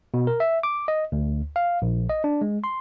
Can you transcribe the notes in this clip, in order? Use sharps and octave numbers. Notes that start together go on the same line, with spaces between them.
B2
A#4
E5
D6
D#5
D2
F5
A#1
D#5
D4
G#3
C6